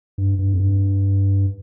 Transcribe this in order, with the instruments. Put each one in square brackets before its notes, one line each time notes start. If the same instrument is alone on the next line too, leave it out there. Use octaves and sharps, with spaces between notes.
[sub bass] G2
G2
F2
G2